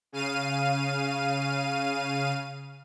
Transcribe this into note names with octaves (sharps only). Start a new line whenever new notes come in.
C#3 F5 D#7